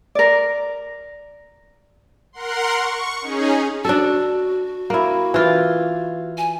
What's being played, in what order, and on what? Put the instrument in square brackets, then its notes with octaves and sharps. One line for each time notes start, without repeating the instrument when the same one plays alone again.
[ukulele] A#4 D5
[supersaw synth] A#4 F#5 C6
C#6
C#4 D#4 G#4
[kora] D4 A4 [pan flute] F#4
[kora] A#3 E4
E3 F4
[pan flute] G#5